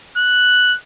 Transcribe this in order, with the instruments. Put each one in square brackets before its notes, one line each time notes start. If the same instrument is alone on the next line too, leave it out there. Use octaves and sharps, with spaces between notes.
[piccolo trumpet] F#6